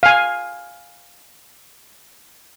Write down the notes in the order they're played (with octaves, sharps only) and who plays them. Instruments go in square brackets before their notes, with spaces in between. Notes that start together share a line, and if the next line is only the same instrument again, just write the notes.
[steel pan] F5 G#5